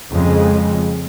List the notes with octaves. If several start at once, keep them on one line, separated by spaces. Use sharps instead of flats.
F2 C#3 G#3